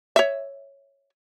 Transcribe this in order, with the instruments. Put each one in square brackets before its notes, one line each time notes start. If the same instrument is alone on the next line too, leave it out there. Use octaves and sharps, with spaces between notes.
[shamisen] C#5 E5